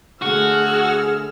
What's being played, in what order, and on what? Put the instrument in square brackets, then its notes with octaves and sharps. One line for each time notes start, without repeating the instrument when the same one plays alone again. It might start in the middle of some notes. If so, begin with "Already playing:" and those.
[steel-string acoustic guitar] D3 A3 [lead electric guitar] F#4 [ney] G#4 [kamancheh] E6 F6